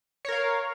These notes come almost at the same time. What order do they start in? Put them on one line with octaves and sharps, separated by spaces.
C#5 A#4 F5